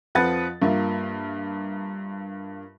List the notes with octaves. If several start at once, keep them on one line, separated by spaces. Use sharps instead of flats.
F2 F3 B4 F#5 A6
G2 A#3 F4 E5